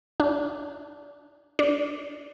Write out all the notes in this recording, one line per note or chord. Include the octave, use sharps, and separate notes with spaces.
D4
D4